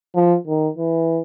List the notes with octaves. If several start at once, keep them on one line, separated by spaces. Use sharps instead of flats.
F3
D#3
E3